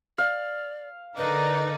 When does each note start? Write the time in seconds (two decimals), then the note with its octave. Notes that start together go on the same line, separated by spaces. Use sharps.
0.18 D5 F5
1.17 D3 D#4 A#4 B4 D5